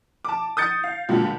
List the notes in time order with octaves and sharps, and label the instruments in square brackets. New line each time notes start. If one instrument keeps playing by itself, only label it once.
[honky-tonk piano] A5 D6
D#6 G6 A6 C#7
F5
C#2 A#2 D3 F#3 G3